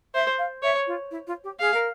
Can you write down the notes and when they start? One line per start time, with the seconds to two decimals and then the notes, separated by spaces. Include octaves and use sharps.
0.14 C5 E5
0.38 F5
0.62 C#5 E5
0.87 F4
1.11 E4
1.27 F4
1.44 G4
1.60 G#4 F5
1.74 A#4